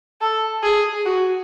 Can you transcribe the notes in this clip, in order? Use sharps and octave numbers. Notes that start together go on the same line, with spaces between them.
A4
G#4
F#4